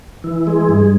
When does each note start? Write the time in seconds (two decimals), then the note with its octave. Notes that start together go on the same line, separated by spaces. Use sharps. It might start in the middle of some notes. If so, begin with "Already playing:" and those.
0.24 E3
0.47 G#3
0.69 G2